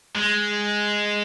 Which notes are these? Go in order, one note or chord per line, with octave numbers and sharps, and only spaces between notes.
G#3